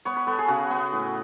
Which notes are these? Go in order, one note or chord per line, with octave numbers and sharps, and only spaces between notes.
B3 C#5
B4
B3 A4
G#4
C#3 F#4
B3
A2